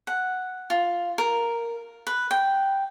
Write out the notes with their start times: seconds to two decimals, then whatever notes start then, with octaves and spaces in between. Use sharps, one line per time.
0.07 F#5
0.70 F4
1.18 A#4
2.07 B4
2.31 G5